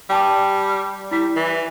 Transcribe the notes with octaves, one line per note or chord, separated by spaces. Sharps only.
G3 G5 A5 D6
G3 E4 B6
E3